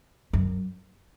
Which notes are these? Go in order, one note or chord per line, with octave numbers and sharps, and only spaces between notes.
F#2